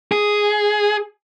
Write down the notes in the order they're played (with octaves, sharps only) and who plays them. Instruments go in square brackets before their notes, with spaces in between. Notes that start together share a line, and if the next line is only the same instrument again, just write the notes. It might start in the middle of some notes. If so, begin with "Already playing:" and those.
[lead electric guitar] G#4